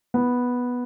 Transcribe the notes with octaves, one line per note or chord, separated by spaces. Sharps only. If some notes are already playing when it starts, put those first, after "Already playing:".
B3